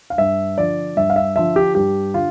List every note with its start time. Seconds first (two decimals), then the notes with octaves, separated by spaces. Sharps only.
0.10 F5
0.18 G2 E5
0.58 D3 F3 D5
0.96 G2 E5
1.10 F5
1.16 E5
1.36 D3 F3 E5
1.56 G4
1.75 G2 G4
2.14 D3 F4